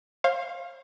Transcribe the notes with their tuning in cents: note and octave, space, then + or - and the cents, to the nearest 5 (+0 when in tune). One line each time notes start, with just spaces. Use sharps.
C5 +40 F5 +0